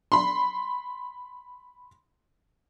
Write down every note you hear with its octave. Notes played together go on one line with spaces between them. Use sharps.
B5 C6